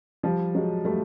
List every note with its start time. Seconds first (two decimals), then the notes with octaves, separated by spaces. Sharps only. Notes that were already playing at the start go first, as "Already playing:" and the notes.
0.23 F3 G3
0.55 F#3 G#3
0.85 G3 A3